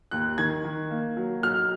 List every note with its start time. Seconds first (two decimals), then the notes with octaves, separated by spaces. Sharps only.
0.11 D#2 F#6
0.38 D#3 G#6
0.64 D#3
0.90 A#3
1.17 F#3
1.43 B1 F6